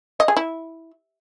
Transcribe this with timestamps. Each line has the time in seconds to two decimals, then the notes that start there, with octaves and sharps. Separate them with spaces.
0.20 D#5
0.28 G#4
0.37 E4